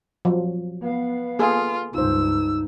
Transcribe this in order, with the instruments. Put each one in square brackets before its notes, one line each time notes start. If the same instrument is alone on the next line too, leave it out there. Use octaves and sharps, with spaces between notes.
[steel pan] F3 F#3
[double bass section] B3 [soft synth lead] F5
[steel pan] A#3 G#4 A4 [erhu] F4
[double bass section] C#2 G2 [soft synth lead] D#4 [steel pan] F4 C5 [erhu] E6